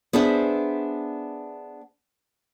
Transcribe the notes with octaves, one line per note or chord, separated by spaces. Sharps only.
B3 D4 G#4 C5 E5